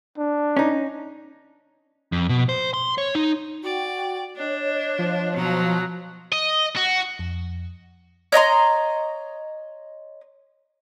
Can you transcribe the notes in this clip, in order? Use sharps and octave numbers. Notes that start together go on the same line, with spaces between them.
D4
C#4 D#4
F2
B2
C5
C6
C#5
D#4
F#4 D5 G5
D4 C#5 D#5
F3
B2 F#3 A#5
D#5
F#4
F2
C#5 D#5 A#5 C6